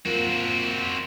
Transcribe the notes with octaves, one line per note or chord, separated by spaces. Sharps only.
A#3 C4 F4 F#4